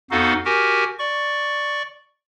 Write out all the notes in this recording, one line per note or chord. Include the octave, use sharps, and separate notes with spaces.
F2 B3 D#4 F#4 A4 F5
F#4 G4 A#4 G#5
D5 C#6